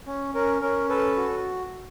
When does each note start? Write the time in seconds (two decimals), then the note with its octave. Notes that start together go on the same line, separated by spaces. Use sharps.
0.07 C#4
0.35 C#4 A#4
0.61 C#4 A#4
0.89 A4 B4
1.17 F#4